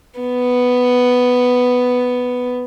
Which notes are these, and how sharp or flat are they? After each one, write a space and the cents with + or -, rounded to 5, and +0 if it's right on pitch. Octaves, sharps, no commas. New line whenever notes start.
B3 +5